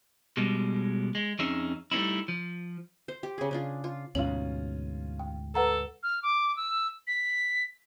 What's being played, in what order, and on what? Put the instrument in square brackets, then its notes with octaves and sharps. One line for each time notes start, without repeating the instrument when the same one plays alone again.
[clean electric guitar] B2 G3 G#3
G#3
F2 C#4 D#4 G#4 E5
G3 A3 C#4 D#4 E4
F3
[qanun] C5
G4
C#3 G#4
C#3 D4 F4
F4
[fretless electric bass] D2 G#2 B2 [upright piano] C#4 F4 [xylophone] F#7
[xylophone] G5
[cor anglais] A4 [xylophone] B4 F#5 A#5
[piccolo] F6
D6
E6
B6